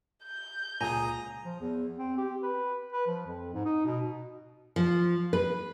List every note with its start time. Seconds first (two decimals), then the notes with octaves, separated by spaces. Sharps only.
0.24 G6
0.81 C#2 A#2 G#4 G#5 A#5 D#6
1.44 F3
1.60 E2
1.98 C4
2.17 G4
2.43 B4
2.92 B4
3.06 F3
3.26 F2
3.54 G#2
3.65 D#4
3.85 B2
4.76 F3
5.33 B4